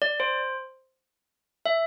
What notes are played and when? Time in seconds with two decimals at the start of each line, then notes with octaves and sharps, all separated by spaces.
0.02 D5
0.20 C5
1.66 E5